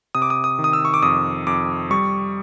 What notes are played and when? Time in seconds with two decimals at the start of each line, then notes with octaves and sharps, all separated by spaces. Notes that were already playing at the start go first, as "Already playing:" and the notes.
0.15 C3 D#6
0.22 D6
0.30 D#6
0.44 D#6
0.59 D#3
0.64 D#6
0.73 E6
0.85 C#6
0.94 D6
1.02 F2 D#6
1.47 F2 D6
1.91 G3 C#6